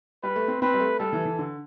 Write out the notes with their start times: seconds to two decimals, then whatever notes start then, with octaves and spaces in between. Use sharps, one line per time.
0.23 G3 B4
0.36 A3
0.48 C4
0.62 C4 B4
0.74 G3
0.80 A3
0.99 G3 A4
1.13 E3
1.25 E3
1.39 D3